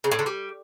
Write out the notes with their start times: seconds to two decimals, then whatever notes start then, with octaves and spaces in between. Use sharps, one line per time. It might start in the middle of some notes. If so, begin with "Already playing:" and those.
0.04 C#3
0.11 A2
0.19 D3
0.26 G3